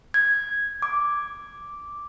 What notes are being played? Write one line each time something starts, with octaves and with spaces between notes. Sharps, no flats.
G#6
D6